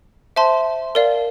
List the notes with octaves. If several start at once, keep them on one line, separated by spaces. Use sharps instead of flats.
C5 E5 A5 C6
A#4 D5 F5